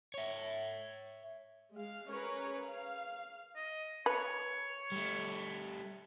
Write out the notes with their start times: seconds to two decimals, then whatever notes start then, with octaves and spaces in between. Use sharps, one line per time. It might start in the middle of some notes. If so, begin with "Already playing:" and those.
0.14 C#5 E5
1.74 G#3 F5
2.10 C#4 G#4 A#4 B4 C#5
2.63 F5
3.56 D#5
4.06 B4 C#5
4.92 G3 A3